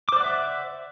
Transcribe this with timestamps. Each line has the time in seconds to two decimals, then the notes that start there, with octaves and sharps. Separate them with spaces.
0.09 D6
0.12 C5
0.16 D5
0.20 F#5
0.24 E5